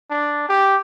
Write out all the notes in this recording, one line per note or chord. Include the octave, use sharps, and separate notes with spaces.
D4
G4